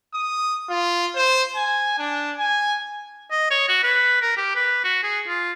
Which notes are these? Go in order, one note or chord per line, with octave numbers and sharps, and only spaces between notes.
D#6
F4
C5
G#5
D4
G#5
D#5
C#5
F#4
B4
A#4
G4
B4
F#4
G#4
F4